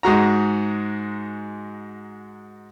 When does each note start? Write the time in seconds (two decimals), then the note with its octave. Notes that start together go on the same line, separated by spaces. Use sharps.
0.03 G#2 G#3 F#4 A#5